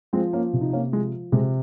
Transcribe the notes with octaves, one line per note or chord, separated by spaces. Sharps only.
F3 G#3 C4
A#3 C#4
C3
D#4
A#3 C#4
F3 G#3
C3 G#3